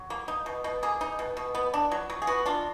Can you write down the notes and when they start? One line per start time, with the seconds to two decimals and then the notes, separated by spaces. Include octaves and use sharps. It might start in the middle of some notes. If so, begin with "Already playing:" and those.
Already playing: F#3
0.10 A#3
0.28 D#4
0.46 B2
0.64 B2
0.83 A#3 G#4
1.01 D#4
1.19 B2
1.37 B2
1.55 B3
1.74 D4
1.92 F#3
2.10 F#3
2.22 G#4
2.27 B3 F#4
2.46 D4 F4